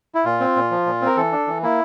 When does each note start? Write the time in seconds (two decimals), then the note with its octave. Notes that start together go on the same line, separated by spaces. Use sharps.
0.15 E4
0.25 A#2 F4
0.40 C4
0.56 A#2
0.71 F3
0.86 A#2
1.01 C4 A#4
1.17 E3 A4
1.32 D4
1.47 E3
1.63 A#3 E4